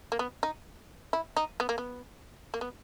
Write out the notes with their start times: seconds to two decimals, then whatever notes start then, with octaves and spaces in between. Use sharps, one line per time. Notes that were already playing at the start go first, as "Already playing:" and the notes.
0.12 A#3
0.19 B3
0.43 D#4
1.13 E4
1.37 D#4
1.60 B3
1.69 A#3
1.78 B3
2.54 A#3
2.61 B3